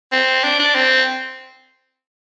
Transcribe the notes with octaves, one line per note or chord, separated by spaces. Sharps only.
C4
D4
D4
C4